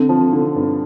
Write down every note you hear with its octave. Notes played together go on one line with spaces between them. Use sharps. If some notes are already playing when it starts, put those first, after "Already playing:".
Already playing: D3 C4
F3
D3
G2